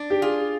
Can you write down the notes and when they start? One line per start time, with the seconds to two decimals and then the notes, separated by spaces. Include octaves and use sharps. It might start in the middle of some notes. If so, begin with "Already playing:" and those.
Already playing: D4
0.10 G4
0.22 F4 G#4